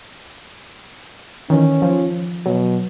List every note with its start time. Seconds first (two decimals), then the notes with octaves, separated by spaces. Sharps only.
1.50 D#3 E3 C#4
1.82 F3
2.46 B2 F#3